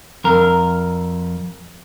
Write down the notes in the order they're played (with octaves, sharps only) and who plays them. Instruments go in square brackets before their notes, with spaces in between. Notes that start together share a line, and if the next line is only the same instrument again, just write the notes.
[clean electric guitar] F2 A#4